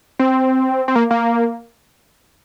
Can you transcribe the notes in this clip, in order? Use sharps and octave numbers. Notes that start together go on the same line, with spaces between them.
C4
C4
A#3
A#3